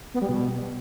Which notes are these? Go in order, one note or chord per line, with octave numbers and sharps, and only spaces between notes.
B3
G3
B2